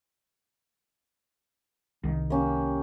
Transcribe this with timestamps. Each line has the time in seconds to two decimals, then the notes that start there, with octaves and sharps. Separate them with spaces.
2.03 C2 D#3
2.30 A#3 C#4 G4